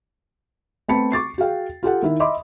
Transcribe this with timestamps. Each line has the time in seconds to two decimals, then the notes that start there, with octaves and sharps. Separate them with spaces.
0.88 A3 B3 C4 A5 B5 C#7
1.12 C#6 D6 A6 C7
1.38 F#4 G#4 F5 G5
1.83 F4 G4 A4 F#5
2.02 D#3 E4 E5
2.20 D#5 E5 B5 C6 D6 D#6